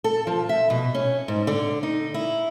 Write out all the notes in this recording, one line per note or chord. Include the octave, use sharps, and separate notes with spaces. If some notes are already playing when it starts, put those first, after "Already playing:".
A4
F3
E5
B2
C#4
G#2
D3
D#4
E4